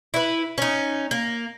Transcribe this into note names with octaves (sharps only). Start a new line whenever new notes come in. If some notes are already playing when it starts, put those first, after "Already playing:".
E4 B4
C#4 D#4
A#3